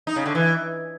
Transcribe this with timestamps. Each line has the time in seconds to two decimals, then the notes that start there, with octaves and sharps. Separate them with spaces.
0.07 D#4
0.16 C#3
0.26 D3
0.35 E3